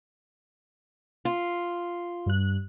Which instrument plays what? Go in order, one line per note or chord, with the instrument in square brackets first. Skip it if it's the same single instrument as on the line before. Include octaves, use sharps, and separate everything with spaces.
[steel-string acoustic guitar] F4
[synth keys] G2 F#6